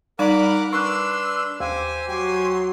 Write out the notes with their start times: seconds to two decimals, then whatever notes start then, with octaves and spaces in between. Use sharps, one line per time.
0.19 G3 D#4 A#4 D5 F#5 B5 D6
0.73 D4 B4 C6 C#6 E6 F#6
1.60 D#2 G4 C5 G#5
2.09 F#3 G4 G#5 C6